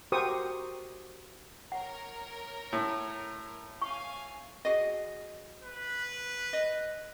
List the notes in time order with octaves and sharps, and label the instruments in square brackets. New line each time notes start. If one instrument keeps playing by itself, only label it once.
[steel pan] F#4 G4 A#4 C5 C#6 D#6
[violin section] A#4 C#5 [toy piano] F#5
[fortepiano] A2
[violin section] F5 G#5 [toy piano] C#6
[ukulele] F#4 G#4 D#5
[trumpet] B4
[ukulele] D#5